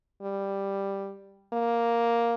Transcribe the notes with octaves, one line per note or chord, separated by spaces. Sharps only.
G3
A#3